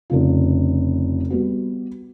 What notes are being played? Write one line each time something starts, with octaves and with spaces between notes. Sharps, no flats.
F1 C#3 F4
G3 B3 F#4